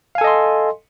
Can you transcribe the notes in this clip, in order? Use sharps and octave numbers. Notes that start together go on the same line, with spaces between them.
A4 D#5 F5 G#5 C6